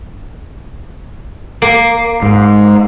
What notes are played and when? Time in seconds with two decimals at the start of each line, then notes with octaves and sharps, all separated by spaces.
1.62 A#3
2.23 G#2